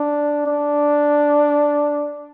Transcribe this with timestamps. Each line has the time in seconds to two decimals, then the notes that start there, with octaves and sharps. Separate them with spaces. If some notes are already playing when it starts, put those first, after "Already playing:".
Already playing: D4
0.46 D4